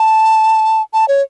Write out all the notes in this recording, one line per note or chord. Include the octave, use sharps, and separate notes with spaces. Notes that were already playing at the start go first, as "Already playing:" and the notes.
Already playing: A5
A5
C#5